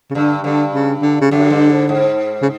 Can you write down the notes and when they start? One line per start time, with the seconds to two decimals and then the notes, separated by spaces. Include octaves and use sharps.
0.10 C#3
0.15 G2 D3
0.44 G2 D3
0.73 C#3
1.02 D3
1.21 C#3
1.31 F#2 D3
1.50 G2
1.70 G#2
1.89 G#2
2.42 C#3